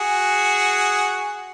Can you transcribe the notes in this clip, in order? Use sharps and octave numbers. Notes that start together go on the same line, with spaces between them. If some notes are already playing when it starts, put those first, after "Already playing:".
Already playing: F#4 G#4